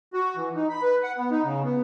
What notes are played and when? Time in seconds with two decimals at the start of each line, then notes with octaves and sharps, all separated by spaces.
0.13 F#4
0.36 E3
0.55 D#4
0.69 B5
0.82 B4
1.03 F#5
1.18 B3
1.31 D#4
1.44 C#3
1.64 B3